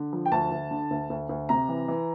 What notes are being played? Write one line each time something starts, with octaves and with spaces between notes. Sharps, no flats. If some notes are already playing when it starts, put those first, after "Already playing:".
Already playing: D3
F3
G5
D2 A5
D2
D3
D2
D2
D2
C3 A#5
E3
E3